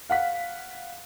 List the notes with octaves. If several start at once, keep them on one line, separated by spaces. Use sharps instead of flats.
F5 F#5 B6